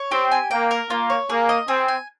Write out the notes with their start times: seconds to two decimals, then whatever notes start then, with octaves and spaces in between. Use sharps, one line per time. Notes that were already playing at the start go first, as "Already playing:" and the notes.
Already playing: C#5
0.11 C4 G4
0.32 G#5
0.51 A#3 G5
0.71 A#4
0.90 A#3 F4
1.10 C#5
1.30 A#3 G#4
1.49 D#5
1.68 C4 G#4
1.88 G#5